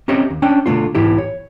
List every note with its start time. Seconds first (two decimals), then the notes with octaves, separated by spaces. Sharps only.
0.08 C4 C#4 G4 C#5 D#5 E5
0.30 D#2
0.42 C#4 D4 G5
0.66 B2 D3 A3 C4 F4
0.95 B1 G#2 E3 E4 G4
1.18 C#5